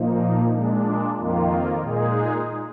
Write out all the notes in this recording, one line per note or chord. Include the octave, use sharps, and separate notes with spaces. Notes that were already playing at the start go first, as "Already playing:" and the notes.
Already playing: A#2 F3 A#3 D#4
A#2 G#3 D4
F2 D#3 A#3 F4
A#2 G#3 D#4 G#4